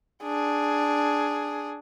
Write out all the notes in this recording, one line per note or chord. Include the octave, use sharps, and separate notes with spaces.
D4 G#4